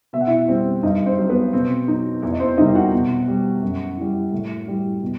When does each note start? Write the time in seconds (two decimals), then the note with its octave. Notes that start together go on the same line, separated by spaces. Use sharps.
0.13 B2 E5
0.21 F#5
0.27 E4 E5
0.48 G3 C4 C5
0.83 G2 D#4 D#5
1.06 C4 C5
1.18 F#3
1.29 B3 B4
1.53 B2 C4
1.88 F#3 D#4
2.22 E2 E3 E4
2.32 D#5
2.40 C4 C5
2.57 C3 D#3 G3 D#4 D#5
2.75 F#4 F#5
2.93 B2
3.28 G3
3.62 F#2
3.97 E3 G3
4.32 A2
4.67 E3 G3
5.02 B2